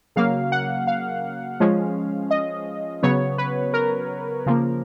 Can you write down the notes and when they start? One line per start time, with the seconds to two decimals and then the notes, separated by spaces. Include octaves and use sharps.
0.16 C#3 F#3 A#3 F5
0.52 F#5
0.87 F5
1.60 F3 G#3 C#4
2.31 D#5
3.03 C#3 F#3 B3 C#5
3.38 B4
3.74 A#4
4.46 C#3 F3 A#3